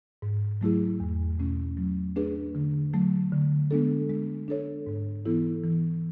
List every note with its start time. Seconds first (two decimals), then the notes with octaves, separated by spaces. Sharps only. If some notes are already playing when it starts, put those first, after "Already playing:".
0.22 G#2
0.61 F#3 A3 E4 G#4
1.00 E2
1.39 B2 A3 C#4
1.77 F#3
2.16 A3 D4 G#4 B4
2.55 D3
2.93 F#3 A3
3.32 D3
3.71 G#3 B3 D4 A4
4.09 G#3
4.48 D4 A4 C#5
4.87 G#2
5.26 E3 B3 E4 A4
5.64 E3